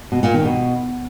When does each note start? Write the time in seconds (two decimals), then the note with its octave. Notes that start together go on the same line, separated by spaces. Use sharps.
0.12 B2
0.23 A#2
0.34 D#3
0.45 B2